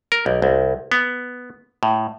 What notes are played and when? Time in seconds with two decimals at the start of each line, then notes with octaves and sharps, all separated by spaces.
0.12 A#4
0.26 B1
0.42 C2
0.92 B3
1.83 A2